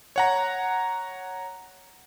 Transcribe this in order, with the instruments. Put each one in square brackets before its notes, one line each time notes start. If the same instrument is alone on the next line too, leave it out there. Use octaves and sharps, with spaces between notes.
[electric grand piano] C#5 F#5 A#5